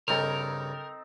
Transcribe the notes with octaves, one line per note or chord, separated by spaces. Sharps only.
G2 C#3 C4 D#4 A4 A#4